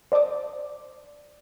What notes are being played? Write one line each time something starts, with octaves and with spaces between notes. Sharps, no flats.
C5 D5 A5 D6 D#6